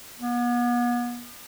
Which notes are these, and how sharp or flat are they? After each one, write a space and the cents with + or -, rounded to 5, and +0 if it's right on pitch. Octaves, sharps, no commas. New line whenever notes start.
B3 -35